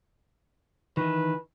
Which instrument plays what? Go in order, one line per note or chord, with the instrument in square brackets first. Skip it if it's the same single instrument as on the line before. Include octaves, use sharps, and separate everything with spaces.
[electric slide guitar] D#3 E3 [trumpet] B4